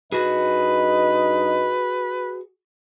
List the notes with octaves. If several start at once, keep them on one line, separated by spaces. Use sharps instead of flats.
G2 D#4 F#4 G#4 B4 D#5